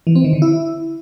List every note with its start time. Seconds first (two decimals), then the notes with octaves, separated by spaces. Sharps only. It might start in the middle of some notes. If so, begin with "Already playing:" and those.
0.07 E3
0.15 C4
0.24 D#3
0.33 D3
0.42 E4